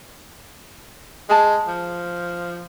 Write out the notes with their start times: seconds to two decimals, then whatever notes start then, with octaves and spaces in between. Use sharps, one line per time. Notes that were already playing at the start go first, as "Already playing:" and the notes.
1.29 G#3 G#4 A5
1.68 F3